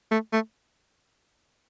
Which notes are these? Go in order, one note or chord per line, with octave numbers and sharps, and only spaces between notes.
A3
A3